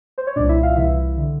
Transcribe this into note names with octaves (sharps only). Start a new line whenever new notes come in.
C5
C#5
C2 A#2 D4 D5
E4 E5
F4 F5
C2 C3 E3 E4 E5
D3